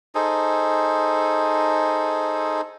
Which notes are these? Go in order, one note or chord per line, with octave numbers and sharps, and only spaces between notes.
D#4 G#4 A4 C5